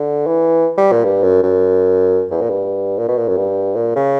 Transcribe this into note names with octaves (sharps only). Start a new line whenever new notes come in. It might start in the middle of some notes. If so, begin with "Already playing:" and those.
Already playing: D3
E3
G3
A#2
G2
F#2
F#2
E2
A#2
G2
A#2
B2
A#2
F#2
G2
A#2
C#3